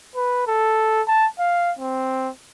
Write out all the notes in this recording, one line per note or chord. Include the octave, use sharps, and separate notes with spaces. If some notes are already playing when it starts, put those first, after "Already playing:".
B4
A4
A5
F5
C4